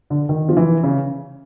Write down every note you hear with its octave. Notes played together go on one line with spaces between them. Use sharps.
D3
D#3
F3
E3
C#3